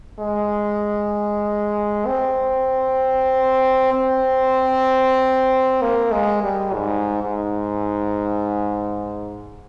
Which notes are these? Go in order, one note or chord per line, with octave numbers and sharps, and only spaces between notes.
G#3
C4
C4
A#3
G#3
G3
G#2
G#2